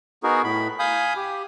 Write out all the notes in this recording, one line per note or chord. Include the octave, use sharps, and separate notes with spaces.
B3 D#4 F#4 G#4 A#4
A2 B5
F5 G#5 B5 D#6 G6
G4